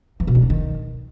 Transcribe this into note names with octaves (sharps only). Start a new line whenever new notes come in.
E3
B2
D3
E2
D#3